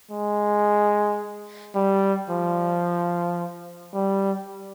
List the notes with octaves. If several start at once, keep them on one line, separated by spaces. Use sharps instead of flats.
G#3
G3
F3
G3